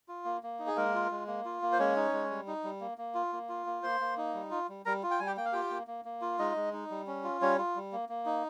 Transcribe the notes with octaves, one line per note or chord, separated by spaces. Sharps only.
F4
A#3
A#3
D#4
G#4
G#3 A#3 A#4
F4
G#3
A#3
F4
A#3
C5
G#3 C#4 C#5
D#4
G#3
G3
D#4
G3
A#3
A#3
F4
A#3
F4
A#3
A#3 C5 C6
A#3
D#4
G3
F4
G3
G3 A#4 A#5
F4
G5
G3 G#5
G4 G5
A#3 G5
F5
F4 G4 G5
A#3
A#3
A#3
F4
G#3 D#4 D#5
G#3
D#4
G3
C#4
F4
G3 C#4 C#5
F4
G3
A#3
A#3
D#4